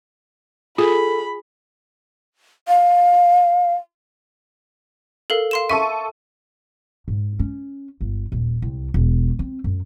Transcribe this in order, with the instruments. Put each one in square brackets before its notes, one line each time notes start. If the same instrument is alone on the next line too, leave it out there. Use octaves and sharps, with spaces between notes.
[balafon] F4 [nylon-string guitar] G#4 [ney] A4 [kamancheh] B5
[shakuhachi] F5
[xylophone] A4 A#4 F5
F5 C6 E7
[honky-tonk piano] A4 C#6 D#7 [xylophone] E5
[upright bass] G#2
C#4
G1
D#1
C2
E1
C4
F#2